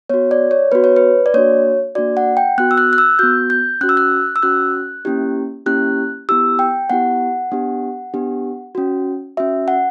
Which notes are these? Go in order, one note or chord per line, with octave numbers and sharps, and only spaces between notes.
B3 F#4 C#5
D5
C#5
B3 F#4 B4
C#5
B4
D5
A#3 D4 F#4 C#5
A#3 D4 F#4 D5
F#5
G5
B3 F#4 F#6
E6
F#6
F#6
E6
B3 F#4 G6
G6
C#4 F#4 F#6
E6
F#6
E6
C#4 F#4 F#6
A#3 C#4 E4 G4
A#3 C#4 E4 G4 F#6
B3 E4 G4 E6
G5
B3 E4 G4 F#5
B3 D4 G4
B3 D4 G4
C#4 F#4
C#4 F#4 E5
F#5